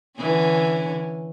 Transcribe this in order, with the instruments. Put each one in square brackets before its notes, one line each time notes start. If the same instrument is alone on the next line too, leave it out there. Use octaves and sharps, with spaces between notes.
[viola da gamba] D3 E3 C#4